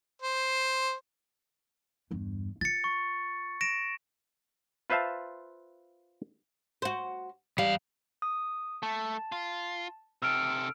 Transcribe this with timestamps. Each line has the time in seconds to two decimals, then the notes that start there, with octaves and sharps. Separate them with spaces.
0.22 C5
2.11 E2 G2
2.61 F4 A6 C#7
2.84 C#6
3.61 A#6 D7 E7
4.90 F4 B4 C5 E5 F5 A5
6.82 F#4 C5
7.58 E2 G3 F5
8.22 D#6
8.83 A3 A5
9.32 F4
10.22 C3 A4 E6 F6 D7